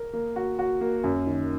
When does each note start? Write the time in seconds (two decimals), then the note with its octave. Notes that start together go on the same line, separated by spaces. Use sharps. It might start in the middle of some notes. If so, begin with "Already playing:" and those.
Already playing: A#4
0.13 A#3
0.36 F#4
0.59 F#4
0.81 A#3
1.04 F#2
1.27 D#3